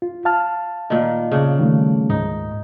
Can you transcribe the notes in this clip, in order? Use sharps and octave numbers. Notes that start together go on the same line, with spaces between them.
F4
F5 A5 F6
A#2 D#3
C#3 D4
D#3 G3 A3
D2 G#2 D#4